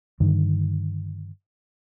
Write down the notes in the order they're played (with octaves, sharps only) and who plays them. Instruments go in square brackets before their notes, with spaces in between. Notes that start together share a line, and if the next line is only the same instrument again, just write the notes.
[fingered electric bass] G2 D3 D#3